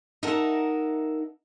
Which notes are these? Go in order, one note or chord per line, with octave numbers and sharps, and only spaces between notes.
D#4 A#4 E5 F#5 A5